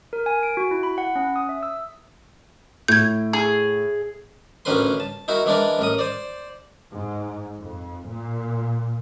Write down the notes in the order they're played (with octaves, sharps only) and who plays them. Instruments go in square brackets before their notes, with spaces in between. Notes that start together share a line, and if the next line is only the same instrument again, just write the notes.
[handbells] A#4
G#5
D7
F#4
E4
B5
F#5
C#4
D#6
E5
E6
[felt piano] A2 [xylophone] G6 G#6
[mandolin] G#4
[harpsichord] A1 D2 C#4 A#4 B4 C6
A5
D#4 E4 F#4 A#4
E3 G#3 D4 E4 A#4 D5
A1 A#4 D#6
C5 D5
[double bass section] G#2
F2
A#2